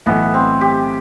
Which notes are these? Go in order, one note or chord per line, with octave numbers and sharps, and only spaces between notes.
B1 A2 E3 B3
C4
G4